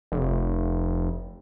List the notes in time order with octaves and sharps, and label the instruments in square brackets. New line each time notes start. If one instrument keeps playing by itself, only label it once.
[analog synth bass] F1